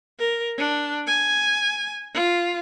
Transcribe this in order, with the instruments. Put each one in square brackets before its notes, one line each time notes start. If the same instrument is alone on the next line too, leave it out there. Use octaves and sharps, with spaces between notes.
[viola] A#4
D4
G#5
F4